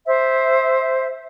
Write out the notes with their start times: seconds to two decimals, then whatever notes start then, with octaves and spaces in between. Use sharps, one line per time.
0.05 C5 E5